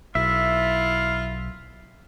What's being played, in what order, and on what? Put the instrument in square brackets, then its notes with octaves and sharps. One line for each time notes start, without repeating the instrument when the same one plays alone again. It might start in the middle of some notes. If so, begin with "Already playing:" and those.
[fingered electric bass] B1 [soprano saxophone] E4 [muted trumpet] F4 [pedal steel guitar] E5